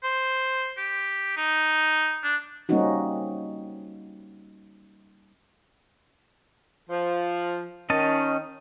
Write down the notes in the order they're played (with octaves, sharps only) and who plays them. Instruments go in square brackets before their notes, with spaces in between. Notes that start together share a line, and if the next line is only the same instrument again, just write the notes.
[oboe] C5
G4
D#4
D4
[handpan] G3 A#3 C4 C#4 D#4 F#4
[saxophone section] F3
[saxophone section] D#3 [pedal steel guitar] C#4 D#5 A5